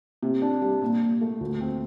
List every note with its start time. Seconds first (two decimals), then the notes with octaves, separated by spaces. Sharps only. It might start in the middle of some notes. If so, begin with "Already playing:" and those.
0.23 C3
0.42 D4
0.62 G3
0.82 A#2
1.02 A#2
1.21 A3
1.41 D2
1.61 C4